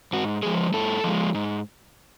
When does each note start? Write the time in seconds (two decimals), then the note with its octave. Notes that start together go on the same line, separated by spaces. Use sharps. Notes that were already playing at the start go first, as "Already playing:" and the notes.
0.13 G#2 F#4
0.43 F3 G#3 G#4
0.74 G#2 A4
1.04 F3 G#3
1.34 G#2